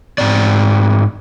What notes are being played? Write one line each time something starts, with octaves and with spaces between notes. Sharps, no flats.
G#2 C4 D5